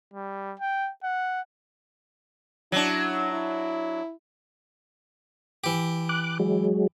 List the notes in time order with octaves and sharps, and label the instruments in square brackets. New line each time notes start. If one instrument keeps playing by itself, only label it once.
[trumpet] G3
G5
F#5
[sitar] F#3 D4 [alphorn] E4
[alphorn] E4
[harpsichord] E3 G4
[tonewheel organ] D6 F#6
F#3 G#3